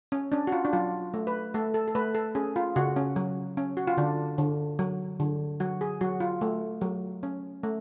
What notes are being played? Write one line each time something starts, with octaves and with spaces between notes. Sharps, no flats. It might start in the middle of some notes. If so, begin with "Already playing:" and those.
C#4
C#4 D4
F#4
F4
D4
F#3 F4
A3
B4
A3 A4
A4
A4
A3 B4
A4
C#4 G#4
F4
C#3 F#4
C#4
F#3
C#4
F#4
F4
D3 D4
D3
F#3
D3
F#3 F#4
G#4
F#3 F#4
F4
A3
F#3
C#4
A3